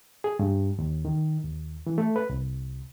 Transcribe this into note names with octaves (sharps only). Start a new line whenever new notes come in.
G#4
G2
D#2
D#3
D#2
E3
A3
B4
C2